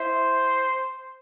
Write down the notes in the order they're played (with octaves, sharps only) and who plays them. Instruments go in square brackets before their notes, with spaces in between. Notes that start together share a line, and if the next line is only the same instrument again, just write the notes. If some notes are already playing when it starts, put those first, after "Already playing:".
Already playing: [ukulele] E4 E5 [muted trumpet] C5